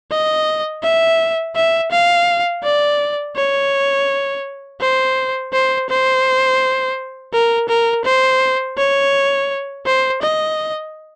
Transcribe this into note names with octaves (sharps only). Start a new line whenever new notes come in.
D#5
E5
E5
F5
D5
C#5
C5
C5
C5
A#4
A#4
C5
C#5
C5
D#5